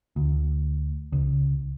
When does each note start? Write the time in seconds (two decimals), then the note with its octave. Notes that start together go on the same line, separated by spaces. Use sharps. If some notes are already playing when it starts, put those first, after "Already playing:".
0.16 D2
1.12 C#2